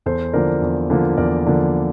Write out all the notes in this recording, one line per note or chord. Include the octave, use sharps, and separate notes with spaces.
E2 A4 C5
D3 F3 A#3 A#4 D5
E2
D3 F3 A#3
E2 A#4 D5
D3 F3 A#3